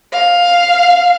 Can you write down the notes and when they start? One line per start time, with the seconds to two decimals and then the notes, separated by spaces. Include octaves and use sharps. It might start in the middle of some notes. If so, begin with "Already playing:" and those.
0.13 F5